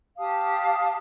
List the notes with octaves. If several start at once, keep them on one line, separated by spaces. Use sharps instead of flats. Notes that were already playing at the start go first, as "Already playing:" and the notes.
G4 F5 A5 D#6